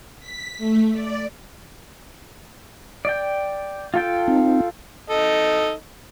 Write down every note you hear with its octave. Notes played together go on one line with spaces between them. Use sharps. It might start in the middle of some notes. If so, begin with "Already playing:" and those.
B6
A3
D5
D5 G5
F4 A4 G5
C4 D#4
D#4 A4 D#5